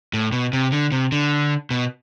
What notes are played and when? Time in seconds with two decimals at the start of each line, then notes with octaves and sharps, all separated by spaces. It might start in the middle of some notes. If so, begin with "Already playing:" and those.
0.13 A2
0.32 B2
0.53 C3
0.72 D3
0.92 C3
1.12 D3
1.70 B2